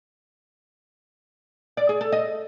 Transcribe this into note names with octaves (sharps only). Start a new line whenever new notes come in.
D5
G#4
A4
D#5